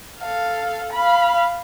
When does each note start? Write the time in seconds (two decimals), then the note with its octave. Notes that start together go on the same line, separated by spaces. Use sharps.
0.20 A4 F5
0.93 F5 B5